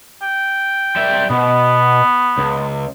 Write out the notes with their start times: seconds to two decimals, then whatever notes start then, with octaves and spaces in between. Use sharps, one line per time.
0.22 G5
0.96 G3 E5
1.30 B2 B3
2.38 C#2